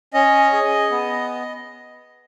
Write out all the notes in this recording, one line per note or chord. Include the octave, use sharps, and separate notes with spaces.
C#4 D#5
G#4
B3